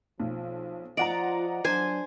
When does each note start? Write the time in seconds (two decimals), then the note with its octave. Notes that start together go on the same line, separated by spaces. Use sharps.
0.20 B1 F3
0.97 F3 F4 D5 D#5 F#5 A#5
1.64 F#3 D4 C5 G#5